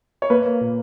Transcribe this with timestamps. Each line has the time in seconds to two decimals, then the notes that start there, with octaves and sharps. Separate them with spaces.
0.22 C#5
0.30 A#3 B4
0.46 A#3
0.61 A#2